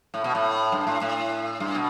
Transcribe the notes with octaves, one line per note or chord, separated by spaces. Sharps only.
A2
B2
A2
G2
A2
A2
G2
B2